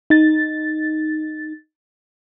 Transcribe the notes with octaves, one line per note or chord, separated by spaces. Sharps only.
D#4 A6